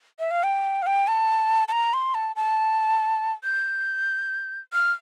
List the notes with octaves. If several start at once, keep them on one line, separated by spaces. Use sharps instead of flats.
E5
F5
G5
F5
G5
A5
A5
A#5
C6
A5
A5
G6
F6